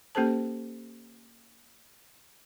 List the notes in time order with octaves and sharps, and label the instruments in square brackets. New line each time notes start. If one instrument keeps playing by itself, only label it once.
[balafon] A#3 C#4 G4 A4 C5 A5